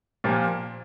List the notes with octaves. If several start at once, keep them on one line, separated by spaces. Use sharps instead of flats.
A#2 F3 A#3 G4